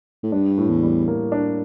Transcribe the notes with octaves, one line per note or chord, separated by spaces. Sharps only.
A2
G2 D4
A2
E2
G3
A#3
D4